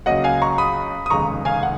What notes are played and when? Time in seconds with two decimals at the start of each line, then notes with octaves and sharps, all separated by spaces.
0.06 C#2 C#3 F#3 A#3 D#5 F#5
0.24 F5 G#5
0.42 A#5 C#6
0.58 B5 D#6
1.06 D#6
1.10 F1 D#2 C#3 G#3 A#5 C#6
1.45 F5 G#5
1.63 F#5